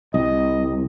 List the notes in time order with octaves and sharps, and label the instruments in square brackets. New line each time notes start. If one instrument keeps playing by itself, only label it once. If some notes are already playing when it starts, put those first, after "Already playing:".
[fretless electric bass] C2 [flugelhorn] D#5